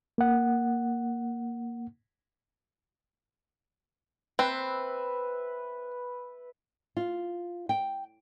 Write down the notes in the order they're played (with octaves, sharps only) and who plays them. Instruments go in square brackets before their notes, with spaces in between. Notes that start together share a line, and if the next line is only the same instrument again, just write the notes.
[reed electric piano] A#3 F#5
[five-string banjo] C4 [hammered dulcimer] B4 E5
[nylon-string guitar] F4
G5